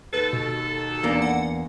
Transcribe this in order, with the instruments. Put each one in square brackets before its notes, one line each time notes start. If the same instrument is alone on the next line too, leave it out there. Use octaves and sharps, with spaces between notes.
[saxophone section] D#2 A4 [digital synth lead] B4
[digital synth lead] B2
[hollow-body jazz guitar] E2 A#3 D4
[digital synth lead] F#5